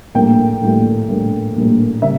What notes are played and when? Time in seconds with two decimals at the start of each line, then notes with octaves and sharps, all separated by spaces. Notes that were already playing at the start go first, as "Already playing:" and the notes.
0.14 A#1 A2 G3 A#3 G5
0.61 A#1 A2 G3 A#3
1.08 A#1 A2 G3 A#3
1.56 A#1 A2 G3 A#3
2.02 C#3 G3 A#3 E5